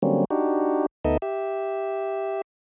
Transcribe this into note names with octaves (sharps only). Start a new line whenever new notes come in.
D3 F#3 G3 A#3 C4 C#4
D4 D#4 F#4 G4
D2 B3 D#4 A4 D#5 E5
G4 E5